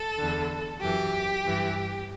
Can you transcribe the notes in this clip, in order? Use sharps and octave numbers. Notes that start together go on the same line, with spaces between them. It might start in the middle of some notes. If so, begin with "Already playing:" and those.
Already playing: A4
E2 D3
F#2 E3 G4
G2 E3